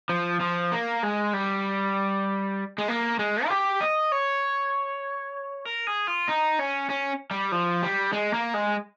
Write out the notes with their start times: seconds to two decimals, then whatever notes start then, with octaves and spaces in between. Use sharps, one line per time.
0.09 F3
0.40 F3
0.72 A#3
1.03 G#3
1.34 G3
2.78 G#3
2.88 A#3
3.19 G#3
3.45 F4
3.50 G4
3.81 D#5
4.12 C#5
5.65 A#4
5.87 G#4
6.07 F4
6.28 D#4
6.59 C#4
6.90 C#4
7.31 G3
7.52 F3
7.82 G3
8.12 G#3
8.34 A#3
8.54 G#3